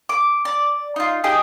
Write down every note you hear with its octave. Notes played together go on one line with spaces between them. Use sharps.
D6
D5
D#4 F4
D#4 G4 G#4 D#5